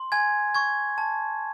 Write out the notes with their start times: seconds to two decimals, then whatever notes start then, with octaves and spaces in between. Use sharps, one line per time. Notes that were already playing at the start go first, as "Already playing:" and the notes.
Already playing: C6
0.12 G#5 G#6
0.55 C#6 G#6
0.98 A5